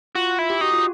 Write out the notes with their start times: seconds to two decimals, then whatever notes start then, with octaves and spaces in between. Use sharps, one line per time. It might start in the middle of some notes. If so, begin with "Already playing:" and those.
0.15 F4 F#4
0.39 E4
0.50 G4
0.61 D#4 F#4
0.72 F4